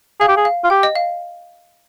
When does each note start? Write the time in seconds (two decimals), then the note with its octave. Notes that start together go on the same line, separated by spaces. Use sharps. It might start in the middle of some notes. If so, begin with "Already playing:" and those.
0.20 G#4 F5
0.28 G4
0.37 G#4
0.45 F5
0.64 F4
0.70 G4 G5
0.83 D#5
0.95 F5